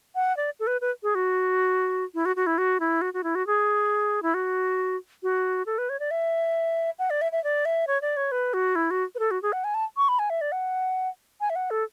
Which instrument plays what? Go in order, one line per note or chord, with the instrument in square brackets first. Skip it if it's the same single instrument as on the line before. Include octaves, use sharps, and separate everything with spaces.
[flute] F#5
D5
A4
B4
B4
G#4
F#4
E4
F#4
F#4
E4
F#4
E4
F#4
F#4
E4
F#4
G#4
E4
F#4
F#4
A4
B4
C#5
D5
E5
F#5
D5
E5
E5
D5
E5
C#5
D5
C#5
B4
F#4
E4
F#4
B4
A4
F#4
G#4
F#5
G#5
A5
C#6
B5
G#5
E5
D5
F#5
G#5
E5
F#5
A4